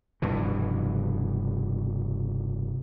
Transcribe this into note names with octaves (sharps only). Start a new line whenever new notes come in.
F1 G2 B2 E3